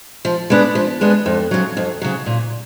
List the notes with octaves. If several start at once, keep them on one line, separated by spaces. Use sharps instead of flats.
F3
G#3 B3 D4
F3
G#3 B3 D4
F2
C#3 F#3
F2
C#3 F#3
A#2